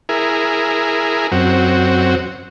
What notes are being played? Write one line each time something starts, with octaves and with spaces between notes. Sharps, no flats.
E4 G#4 A#4
F#2 C4 F#4